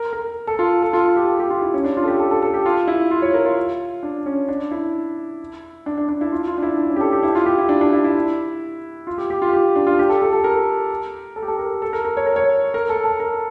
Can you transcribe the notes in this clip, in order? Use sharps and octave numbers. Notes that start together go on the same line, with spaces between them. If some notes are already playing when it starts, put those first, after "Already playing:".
Already playing: A#4
A#4
A4
F4
A4
F4
F4
G4
A4
G4
F4
E4
C#4
D4
F4
A4
G4
A4
A4
A4
G4
F4
E4
F4
C#5
A#4
F4
D4
C#4
D4
E4
D4
D4
D4
E4
F4
F4
D4
E4
D4
C#4
G4
A4
G4
E4
F4
G4
E4
D4
D4
E4
E4
F4
G4
G4
F4
G4
D4
F4
G4
A4
A4
A4
A#4
A4
G4
A4
A#4
A4
A#4
A#4
C#5
A#4
C#5
A#4
A4
A4
A#4